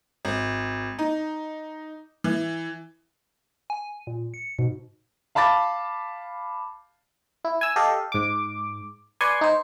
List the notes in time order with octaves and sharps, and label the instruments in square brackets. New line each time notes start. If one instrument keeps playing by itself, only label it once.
[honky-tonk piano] G#1
D#4
E3
[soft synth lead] G#5
A#2
C#7
[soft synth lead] G#2 [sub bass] B2
[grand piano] F5 A5 B5 D6 A6
[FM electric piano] E4
G#5 E6
G4 A4 D#5 F5
G#2 D6
B4 D5 G#5 C6 C#6
D#4 C5